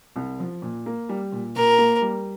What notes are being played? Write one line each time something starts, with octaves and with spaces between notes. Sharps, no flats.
C2
F3
A#2
A#3
G3
A#2
A#2 A#4
A#3
G3